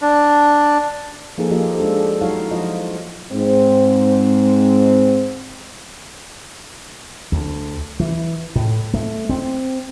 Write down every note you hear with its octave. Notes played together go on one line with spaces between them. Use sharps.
D4
F3 A#3 D#4 G#4 A4
F3 A#3 F4 G4 G#4 D#5
G#3 D4 G4 A4
D4 A4
F#3 D#4 E4 F#4 C#5 F5
F3 F4 D#5
G#2 C4
D2
E3
A2
A3
C4